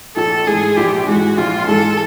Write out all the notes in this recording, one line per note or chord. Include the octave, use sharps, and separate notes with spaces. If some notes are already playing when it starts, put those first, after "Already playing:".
A#1 A4
G#2 E3 G#3 G#4
A#1 G4
G#2 E3 G#3 F#4
A#1 F4
G#2 E3 G#3 A4